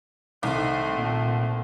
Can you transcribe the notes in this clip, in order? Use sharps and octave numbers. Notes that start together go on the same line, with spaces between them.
C2 D#3 A3 C4
A#2